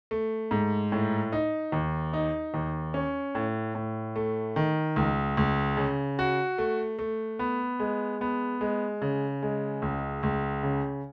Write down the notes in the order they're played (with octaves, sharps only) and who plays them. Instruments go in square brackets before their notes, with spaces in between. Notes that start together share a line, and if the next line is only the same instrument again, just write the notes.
[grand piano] A3
G#2
A2
D#4
D#2
D#4
D#2
C#4
A2
A2
A3
D#3
C#2
C#2
C#3
F#4
A3
A3
B3
G#3
B3
G#3
C#3
G#3
C#2
C#2
C#3